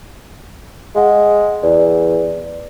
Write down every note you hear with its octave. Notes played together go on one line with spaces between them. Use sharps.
G#3 F5 F#5
E2 D5